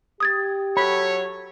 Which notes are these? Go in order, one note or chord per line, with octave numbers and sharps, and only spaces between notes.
G4 D#6 G#6 A6
F#3 A4 C#5 B5